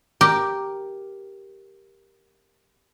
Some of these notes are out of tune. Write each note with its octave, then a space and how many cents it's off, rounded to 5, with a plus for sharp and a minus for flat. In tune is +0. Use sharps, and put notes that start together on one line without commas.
G4 +0 A#4 +5